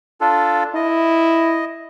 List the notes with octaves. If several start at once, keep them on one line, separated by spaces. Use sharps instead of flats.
D4 F4 A4
E4 D#5